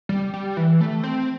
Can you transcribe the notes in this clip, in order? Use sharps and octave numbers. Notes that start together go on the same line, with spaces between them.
G3
G3
E3
A3
C4